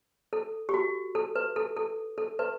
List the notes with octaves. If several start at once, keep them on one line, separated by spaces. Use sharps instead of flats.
A4
G4
F#4
A4
B4
A4
A4
A4
B4